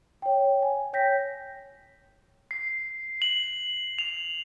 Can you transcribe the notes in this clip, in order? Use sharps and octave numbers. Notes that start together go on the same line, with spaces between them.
C#5 G5
G#5
C#5 G5 G6 A#6 B6
C7
F#7
F7